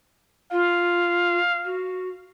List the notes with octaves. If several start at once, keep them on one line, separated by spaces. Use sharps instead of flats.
F4 F5
F#4